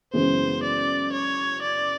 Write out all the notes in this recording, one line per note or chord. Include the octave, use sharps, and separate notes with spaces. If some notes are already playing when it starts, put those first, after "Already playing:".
F#2 C#3 E3 G#3 B3 C5
D5
C#5
D5